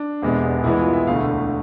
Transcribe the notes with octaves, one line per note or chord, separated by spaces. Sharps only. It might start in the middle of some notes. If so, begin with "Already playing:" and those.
Already playing: D4
E1 E2 C3 G#3 B3
C2 C3 E3 G#3 B3 E4
F4
E5
E1 D2 D3 A3 F5